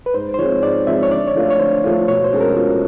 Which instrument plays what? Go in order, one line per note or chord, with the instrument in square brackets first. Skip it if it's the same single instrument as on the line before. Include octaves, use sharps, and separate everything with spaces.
[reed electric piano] B4
[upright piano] G#2 [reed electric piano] C5
[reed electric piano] C5
[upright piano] F3 G#3 C4 [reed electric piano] C#5
[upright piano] G#2 [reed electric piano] D5
[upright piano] F3 G#3 C4 [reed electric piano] E5
[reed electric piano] C#5
[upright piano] D3 [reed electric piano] D5
[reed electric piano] C#5
[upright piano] F3 A3 D4 F4
[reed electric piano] C#5
[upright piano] D3 [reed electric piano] C5
[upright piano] F3 A3 D4 F4
[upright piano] B2 [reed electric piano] C#5
[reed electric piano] C5
[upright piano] G#3 C#4 F#4 A4
[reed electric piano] A#4
[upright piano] B2 [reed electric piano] F4